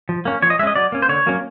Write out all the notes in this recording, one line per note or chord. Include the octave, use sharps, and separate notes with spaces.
F3
A#3 C#4
F3 C#5
D#5
G#3 C#4 D#5 E5
F#3 D5
A#3 C#4
C5
D3 C#5
F#3 A#3 C#4